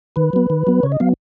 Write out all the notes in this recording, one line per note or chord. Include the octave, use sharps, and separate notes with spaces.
D#3 B4
F#3 B3
D#3
F#3 B3
C#3 C#5
D#5
F#3 B3 F5